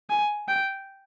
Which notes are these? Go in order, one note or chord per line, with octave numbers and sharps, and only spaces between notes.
G#5
G5